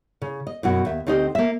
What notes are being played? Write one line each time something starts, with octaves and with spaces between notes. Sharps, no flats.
C#3
D#5
F#2 B2 F#4
D#2 E5
D2 C4 D#4 G4 D#5
A#3 E5